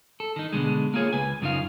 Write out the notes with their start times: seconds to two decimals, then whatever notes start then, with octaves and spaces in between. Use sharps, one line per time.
0.20 A4
0.36 D#3 D#4
0.53 B2 D3 G#3
0.94 A#3 F4 G#4 C#5
1.13 C#2 B4 G#5
1.42 F#2 C#3 D#4 F4 F5